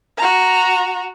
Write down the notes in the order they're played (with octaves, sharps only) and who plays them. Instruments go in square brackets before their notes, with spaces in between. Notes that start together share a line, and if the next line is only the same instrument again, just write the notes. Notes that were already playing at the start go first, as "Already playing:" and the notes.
[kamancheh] F#4 A#5